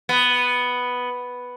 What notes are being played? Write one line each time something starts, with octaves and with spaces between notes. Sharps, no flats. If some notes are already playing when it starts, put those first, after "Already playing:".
B3